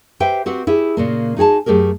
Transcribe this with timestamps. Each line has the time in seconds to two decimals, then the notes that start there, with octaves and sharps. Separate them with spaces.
0.20 G4 B4 C5 E5 G5
0.46 C4 F#4 G4 B4 F#5
0.67 E4 G4 G#4
0.97 A#2 C#3 A#3
1.37 D#4 F#4 G#4 G#5 A5
1.66 F#2 A3 G4 G#4 A#4